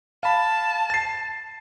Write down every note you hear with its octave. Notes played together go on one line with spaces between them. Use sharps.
F5 A5 B5
A6 C7